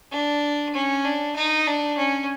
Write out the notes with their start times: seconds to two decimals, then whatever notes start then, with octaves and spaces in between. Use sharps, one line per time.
0.11 D4
0.74 C#4
1.04 D4
1.36 D#4
1.67 D4
1.97 C#4